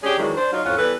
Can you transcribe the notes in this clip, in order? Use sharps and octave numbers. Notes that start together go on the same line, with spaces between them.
C#4 D4 G4 G#4
D#3 E3 F#3 G#3 D4
D4 C5
F#3 D#4 F4
F2 A2 C#4 F4 F#5
E3 G3 B3 A4 B4